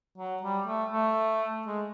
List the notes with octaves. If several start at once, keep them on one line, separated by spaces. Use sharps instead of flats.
F#3
G3
A3
A3
G#3